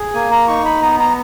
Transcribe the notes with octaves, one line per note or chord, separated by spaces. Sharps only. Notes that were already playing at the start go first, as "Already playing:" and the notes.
Already playing: G#4
A#3 G#5
A#5
D#4 C#6
B5
B3 A#5
A#5